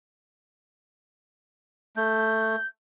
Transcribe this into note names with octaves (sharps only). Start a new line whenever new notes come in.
A3 G6